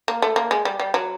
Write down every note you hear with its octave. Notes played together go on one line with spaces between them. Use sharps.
A#3
A3
A#3
G#3
G3
G3
F#3